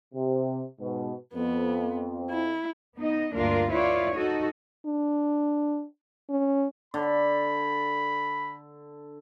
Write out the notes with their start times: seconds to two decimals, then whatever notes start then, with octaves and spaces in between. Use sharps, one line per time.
0.14 C3
0.80 G#2 B2
1.34 F2 B3
2.31 E4
2.97 B3 D#4 D#5
3.34 D2 G2 A#3 D4 F4 A#4
3.72 E4 F4 B4 C#5 D5
4.15 D#4 F#4 A4 D#5
4.86 D4
6.30 C#4
6.94 D3 B5